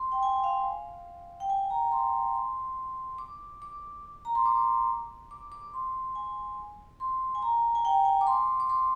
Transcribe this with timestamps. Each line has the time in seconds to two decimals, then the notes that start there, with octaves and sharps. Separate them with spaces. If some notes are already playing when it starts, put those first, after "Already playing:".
Already playing: C6
0.12 G5
0.23 G#5
0.44 F5
1.40 G5
1.50 G#5
1.70 A#5
1.92 C6
2.34 C6
3.18 D6
3.62 D6
4.25 A#5
4.35 C6
4.46 D6
5.31 D6
5.52 D6
5.74 C6
6.15 G#5
7.00 C6
7.35 G#5
7.42 A#5
7.75 G#5
7.85 G5
8.05 G#5
8.21 D6
8.27 C6
8.60 D6
8.69 C6